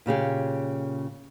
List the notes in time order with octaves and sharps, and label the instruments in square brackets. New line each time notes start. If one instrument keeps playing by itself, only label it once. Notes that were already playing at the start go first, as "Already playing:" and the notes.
[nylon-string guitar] A#2 C#3 G4 G#4